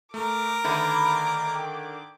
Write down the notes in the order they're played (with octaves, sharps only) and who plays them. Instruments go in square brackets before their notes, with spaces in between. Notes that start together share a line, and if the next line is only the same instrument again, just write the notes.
[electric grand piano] A3 [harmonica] A#4 [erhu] D6
[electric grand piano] D3 D#3 [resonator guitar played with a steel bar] A3 B4
[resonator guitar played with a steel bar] G5